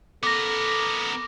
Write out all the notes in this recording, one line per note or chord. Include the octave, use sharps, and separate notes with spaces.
B3 A4 A#4 D6 A#6